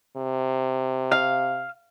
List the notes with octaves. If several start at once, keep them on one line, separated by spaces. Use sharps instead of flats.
C3
F5